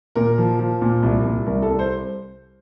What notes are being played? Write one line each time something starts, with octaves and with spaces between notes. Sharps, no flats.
A#2 A#4
F3
F3
A#2
C2
C2
C2 A#4
A4
C2
C5